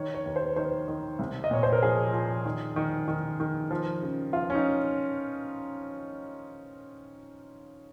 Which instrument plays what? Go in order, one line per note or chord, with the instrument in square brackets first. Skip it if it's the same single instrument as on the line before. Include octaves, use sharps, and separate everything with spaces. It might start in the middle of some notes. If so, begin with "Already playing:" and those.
Already playing: [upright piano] D#3 C#5
C#5
D#2
C5
D#3 C5
D#3
C2
D#5
A#2 C#5
C5
A#4
F3 G#4
F3
D#3
D#3
D#3
D#3
F3
C#3
F3 F4
C#4
D#4